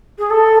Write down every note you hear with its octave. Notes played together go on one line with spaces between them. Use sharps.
G#4
A4